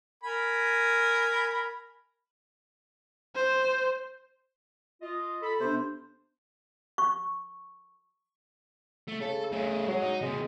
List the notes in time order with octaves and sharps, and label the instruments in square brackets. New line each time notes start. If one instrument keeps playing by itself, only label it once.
[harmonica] A#4 G#5 B5
[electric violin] C5
[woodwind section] F4 D#5
[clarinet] A4 [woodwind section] B5
[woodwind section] C3 [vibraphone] B3 D4 [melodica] C5
[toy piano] C#6
[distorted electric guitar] A3
[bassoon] C#3 [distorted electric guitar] A4
[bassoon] C#3 [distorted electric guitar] A3 G#4
[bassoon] F#3 [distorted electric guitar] G#3 G#4
[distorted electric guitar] D#4
[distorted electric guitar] C3 A#3 [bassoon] G#3